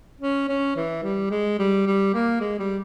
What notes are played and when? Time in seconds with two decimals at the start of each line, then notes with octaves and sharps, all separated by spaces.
0.21 C#4
0.49 C#4
0.76 E3
1.03 G3
1.30 G#3
1.59 G3
1.86 G3
2.14 A#3
2.40 G#3
2.59 G3